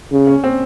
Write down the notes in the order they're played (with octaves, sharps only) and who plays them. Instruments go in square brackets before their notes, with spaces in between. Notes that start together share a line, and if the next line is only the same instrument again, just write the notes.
[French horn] C#3
[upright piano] C#4
C4